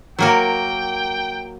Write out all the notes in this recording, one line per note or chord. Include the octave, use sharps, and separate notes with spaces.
F#3 A#3 A#4 G5